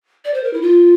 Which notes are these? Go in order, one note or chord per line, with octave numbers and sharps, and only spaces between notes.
D5
C5
A#4
E4
F4